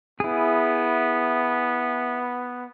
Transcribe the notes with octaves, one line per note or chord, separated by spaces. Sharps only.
B3 E4 G#4